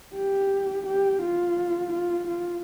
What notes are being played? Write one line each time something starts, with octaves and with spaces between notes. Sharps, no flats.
G4
G4
F4
F4
F4